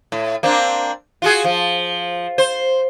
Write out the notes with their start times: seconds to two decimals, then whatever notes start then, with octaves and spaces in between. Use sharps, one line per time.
0.12 A2
0.43 A#3 C4 D4
1.22 F4 F#4 G#4
1.45 F3
2.38 C5